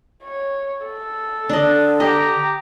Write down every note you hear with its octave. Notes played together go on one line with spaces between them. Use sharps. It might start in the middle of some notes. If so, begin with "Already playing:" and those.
C#5
A4
D3 D4 D#5
G4 D#5 A#5